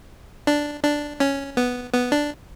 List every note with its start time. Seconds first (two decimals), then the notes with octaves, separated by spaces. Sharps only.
0.47 D4
0.84 D4
1.20 C#4
1.57 B3
1.93 B3
2.12 D4